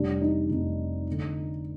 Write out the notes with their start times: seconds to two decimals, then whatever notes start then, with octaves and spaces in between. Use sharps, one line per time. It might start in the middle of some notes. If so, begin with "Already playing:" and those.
Already playing: F1 F2 C3 G3 D4
0.21 D#4
0.50 F1 F2 C3 G3
1.11 D3